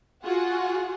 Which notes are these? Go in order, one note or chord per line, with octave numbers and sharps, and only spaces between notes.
F4 F#4 G#4 F#5